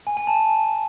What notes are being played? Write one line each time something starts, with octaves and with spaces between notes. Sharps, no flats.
G#5
G#5
A5